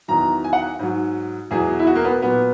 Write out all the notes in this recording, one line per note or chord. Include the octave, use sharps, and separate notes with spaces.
E2 D#3 F#3 A#5
G#5
F#5
G#2 F#3
E2 B2 F#3 G#4
E4
F#4
A#3
B3
A#2 F#3 B3